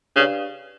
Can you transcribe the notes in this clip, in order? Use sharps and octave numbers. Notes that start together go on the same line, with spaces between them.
C#3 D4 G4 B4 D5 F5